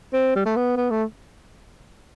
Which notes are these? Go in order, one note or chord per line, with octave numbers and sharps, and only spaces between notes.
C4
G3
A3
B3
B3
A3